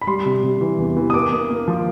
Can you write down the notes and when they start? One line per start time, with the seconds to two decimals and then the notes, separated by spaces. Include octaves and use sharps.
0.02 B5
0.07 G3 C6
0.25 C3
0.44 C3
0.61 E3
0.78 E2
0.97 E3
1.10 D#6
1.14 A#3 D6
1.32 A#3
1.50 A#3
1.68 F3